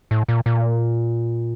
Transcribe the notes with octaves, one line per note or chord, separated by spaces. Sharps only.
A2
A#2
A#2